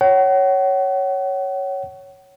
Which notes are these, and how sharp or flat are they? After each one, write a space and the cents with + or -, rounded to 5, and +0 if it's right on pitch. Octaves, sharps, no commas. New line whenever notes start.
C#5 +0 F#5 +40